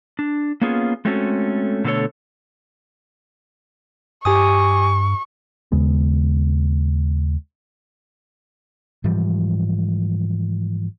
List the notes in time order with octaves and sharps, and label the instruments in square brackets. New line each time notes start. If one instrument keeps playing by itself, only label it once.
[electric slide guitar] D4
A#3 B3 C#4 F4 G#4
G#3 A3 C4 C#4 F#4 A4
B2 D3 A3 B3 A4 C#5
[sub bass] G2 [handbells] G4 G#5 D#6 [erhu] C#6
[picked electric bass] D#2 C#3 G#3 B3
[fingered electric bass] G#2 E3 F3 G3